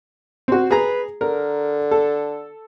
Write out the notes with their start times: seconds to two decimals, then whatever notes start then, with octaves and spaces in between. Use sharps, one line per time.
0.48 C4 F#4
0.71 G#4 B4 A#5
1.21 D3 A#4
1.91 A4